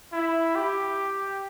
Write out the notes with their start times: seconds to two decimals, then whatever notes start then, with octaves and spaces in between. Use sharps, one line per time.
0.12 E4
0.55 G4